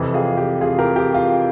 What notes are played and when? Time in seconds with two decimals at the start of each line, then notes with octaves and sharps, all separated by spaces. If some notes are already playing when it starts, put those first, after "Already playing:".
Already playing: F2 C3 E3
0.14 F4 G#4
0.37 G4
0.61 F4 G#4
0.78 G4 A#4
0.96 G4
1.14 F4